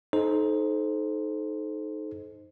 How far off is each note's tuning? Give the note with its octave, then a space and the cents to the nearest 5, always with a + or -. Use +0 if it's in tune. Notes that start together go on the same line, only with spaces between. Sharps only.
D#4 +0 A4 -35 C5 +0